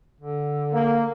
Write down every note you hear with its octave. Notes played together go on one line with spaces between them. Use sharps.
D3
A#3